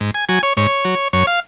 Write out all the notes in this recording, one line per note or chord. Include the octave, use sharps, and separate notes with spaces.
G#2
G#5
F#3 G#5
C#5
G#2 C#5
F#3
F#2 C#5
F5